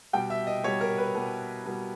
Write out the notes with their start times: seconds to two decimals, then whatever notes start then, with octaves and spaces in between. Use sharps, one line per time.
0.13 B2 G3 G5
0.30 E5
0.47 D#5
0.64 B2 G3 C#5
0.81 A#4
0.98 B4
1.15 B2 G3
1.66 B2 G3